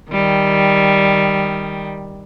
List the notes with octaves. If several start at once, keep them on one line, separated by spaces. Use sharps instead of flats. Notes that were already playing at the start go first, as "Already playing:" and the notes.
D#3 G3